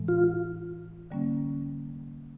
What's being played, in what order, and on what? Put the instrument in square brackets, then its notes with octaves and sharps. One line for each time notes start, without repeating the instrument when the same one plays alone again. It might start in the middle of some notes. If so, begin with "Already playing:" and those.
Already playing: [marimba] A2 E3 G#3
[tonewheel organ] F4
[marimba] D3 G3 A#3 C#4